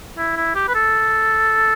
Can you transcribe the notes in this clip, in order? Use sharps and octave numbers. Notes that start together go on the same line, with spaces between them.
E4
E4
G4
B4
A4